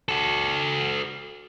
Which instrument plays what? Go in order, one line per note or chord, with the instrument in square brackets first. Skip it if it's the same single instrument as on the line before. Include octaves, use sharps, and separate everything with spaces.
[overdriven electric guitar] F#4 A4